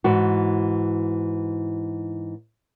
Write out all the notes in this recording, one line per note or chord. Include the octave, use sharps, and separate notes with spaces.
G#2 E3 F#4